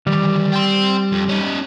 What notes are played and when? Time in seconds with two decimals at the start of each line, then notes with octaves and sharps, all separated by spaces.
0.07 D#3 E3 G3
0.52 G5 C6
1.12 F2
1.29 C#4 D#4